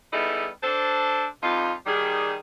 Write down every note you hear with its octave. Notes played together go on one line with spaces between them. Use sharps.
G3 B3 D#4 E4 G#4 A4
D4 A4 C5
F2 G3 D#4 F4
D#3 G3 G#4